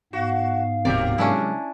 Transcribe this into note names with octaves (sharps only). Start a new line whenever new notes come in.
G#2 B3 F#4 F5
D1 C3 F3 C4 G4 A#4 D5
C3 F#3 G#3 C#4 D4 E4